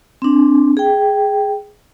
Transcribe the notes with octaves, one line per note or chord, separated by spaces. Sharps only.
C4 D4
G#4 G5